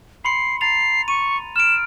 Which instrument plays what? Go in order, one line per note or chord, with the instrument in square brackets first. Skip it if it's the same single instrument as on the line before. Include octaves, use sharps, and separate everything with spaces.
[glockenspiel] B5 C6 C#7 [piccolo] C7
[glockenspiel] A#5 A6 F7 [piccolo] C7
[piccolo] C#6 [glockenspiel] D#7
[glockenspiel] F6 D7 [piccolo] E7